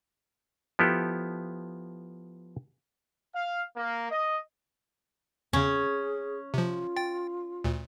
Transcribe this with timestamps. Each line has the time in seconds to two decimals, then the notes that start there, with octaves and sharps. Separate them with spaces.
0.79 F3 B3 E4 G4 A4
3.33 F5
3.75 A#3
4.09 D#5
5.53 E2 C#3 C#4 G#4
6.54 C3 F3 F4
6.96 G5 A6
7.64 D2 A#2